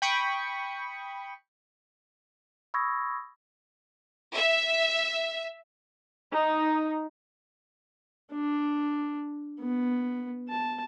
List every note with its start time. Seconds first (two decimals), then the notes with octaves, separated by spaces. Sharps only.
0.02 G5 B5 C#6 D#6
2.74 B5 C#6 D#6 E6 G#6 A#6
4.35 E5
6.32 D#4
8.32 D4
9.61 B3
10.49 A5